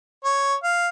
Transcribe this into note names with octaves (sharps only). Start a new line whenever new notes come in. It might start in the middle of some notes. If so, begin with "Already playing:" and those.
C#5
F5